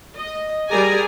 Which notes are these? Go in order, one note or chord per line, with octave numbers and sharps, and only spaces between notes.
D#5
G3 G#4 A#4 D5 G#5 A#5